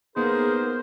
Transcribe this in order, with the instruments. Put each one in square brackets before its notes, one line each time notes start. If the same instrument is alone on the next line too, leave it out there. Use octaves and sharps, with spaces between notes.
[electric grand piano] A#3 B3 D#4 [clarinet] G#4 [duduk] A#4 [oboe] C5